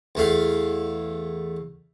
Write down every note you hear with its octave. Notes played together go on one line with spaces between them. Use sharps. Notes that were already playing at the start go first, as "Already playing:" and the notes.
E2 A3 F5